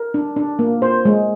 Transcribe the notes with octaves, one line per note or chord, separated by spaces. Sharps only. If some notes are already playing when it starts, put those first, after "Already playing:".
Already playing: A#4
D4
D4
A#3
C5
G#3